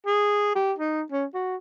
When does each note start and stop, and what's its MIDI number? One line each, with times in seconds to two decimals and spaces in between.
0.06 0.52 68
0.55 0.73 67
0.78 1.02 63
1.12 1.26 61
1.34 1.56 66